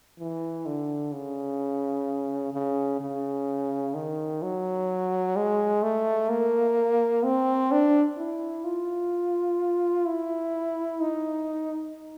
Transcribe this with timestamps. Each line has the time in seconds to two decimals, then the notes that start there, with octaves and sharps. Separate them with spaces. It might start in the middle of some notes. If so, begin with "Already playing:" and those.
0.19 E3
0.66 D3
1.13 C#3
2.54 C#3
3.01 C#3
3.95 D#3
4.42 F#3
5.36 G#3
5.83 A3
6.29 A#3
7.24 C4
7.72 D4
8.17 E4
8.64 F4
10.06 E4
11.00 D#4